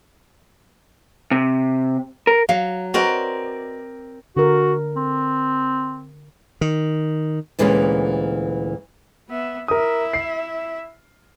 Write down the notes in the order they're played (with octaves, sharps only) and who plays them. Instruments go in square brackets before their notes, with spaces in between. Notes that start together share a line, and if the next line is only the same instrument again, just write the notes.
[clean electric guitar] C3
A#4
[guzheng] F#3 [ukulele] F5
[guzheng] C4 A#4 D5 [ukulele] F#4 B4 D#5
[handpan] D3 A#4 [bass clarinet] F#4
[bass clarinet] C4
[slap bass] D#3
[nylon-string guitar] D2 A#2 E3 G#3 C#4 B4
[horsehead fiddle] B3 E5
[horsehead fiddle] E4 E5 [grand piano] A#4 D#6
[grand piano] C7